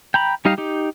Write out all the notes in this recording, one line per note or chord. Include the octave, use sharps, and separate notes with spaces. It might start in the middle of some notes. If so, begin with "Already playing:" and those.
G5 A#5 B5
G3 D#4 G4 D#5 F5
D#4 G4